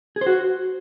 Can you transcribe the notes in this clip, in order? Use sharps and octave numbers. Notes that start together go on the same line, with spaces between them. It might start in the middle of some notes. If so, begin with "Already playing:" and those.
G#4
C5
F#4